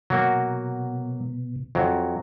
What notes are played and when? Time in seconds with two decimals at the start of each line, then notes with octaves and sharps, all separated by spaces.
0.10 B2 F#3 A#3 F#4
1.75 F2 F#3